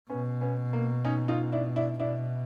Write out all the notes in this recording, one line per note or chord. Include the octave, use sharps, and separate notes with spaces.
B2 B3 C#4
B3 C#4
A#3
C#4 D#4
D#4 F4
D4 E4
D4 E4
B2 D4 E4